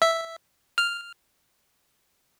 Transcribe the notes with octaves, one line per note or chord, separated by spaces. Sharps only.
E5
F6